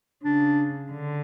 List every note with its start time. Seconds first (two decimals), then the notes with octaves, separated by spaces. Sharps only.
0.24 C#3 D4
0.92 D3